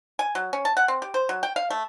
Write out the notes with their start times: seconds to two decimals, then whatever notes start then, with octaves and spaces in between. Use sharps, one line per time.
0.19 G#5
0.35 F#3
0.53 C#4
0.65 A5
0.77 F#5
0.88 C4
1.02 G4
1.14 C5
1.29 F#3
1.43 G5
1.56 F5
1.70 A3